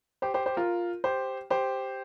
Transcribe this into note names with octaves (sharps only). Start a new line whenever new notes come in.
G4 C5
G4 C5
G4 C5
F4 A#4
G4 C5
G4 C5